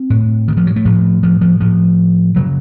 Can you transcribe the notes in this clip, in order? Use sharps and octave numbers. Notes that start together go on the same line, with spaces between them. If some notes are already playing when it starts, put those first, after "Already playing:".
Already playing: C4
A2
D#3
F3
F#3
A3
A2 F3
F3
F3
A2 F3
C#3 F#3